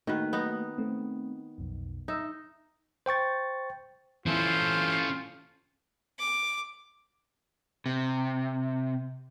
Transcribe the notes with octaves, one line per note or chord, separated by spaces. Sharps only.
D#3 A3 A#3 F#4 B4
B3 D#4
A3 C4
B1 F2
D#4 E5 E6
C5 G5 C#6 A6
E3 C#4 E4 F4 A4 C5
D6
C3